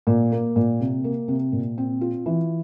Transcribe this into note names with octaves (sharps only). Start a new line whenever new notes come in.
A#2
A#3
A#2
C3
A#3
C3
A#2
C4
F4
E3